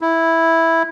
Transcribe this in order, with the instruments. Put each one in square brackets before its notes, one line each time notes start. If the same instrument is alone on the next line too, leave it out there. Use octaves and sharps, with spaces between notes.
[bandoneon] E4